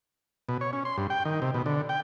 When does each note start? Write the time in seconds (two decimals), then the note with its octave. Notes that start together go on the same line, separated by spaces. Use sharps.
0.49 B2
0.61 C#5
0.73 C#4
0.85 C6
0.98 G2
1.10 G5
1.25 D#3
1.42 C3
1.54 B2
1.66 D3
1.89 G5